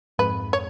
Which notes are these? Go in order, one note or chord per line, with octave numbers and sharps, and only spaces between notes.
F2 G#2 B4
C#5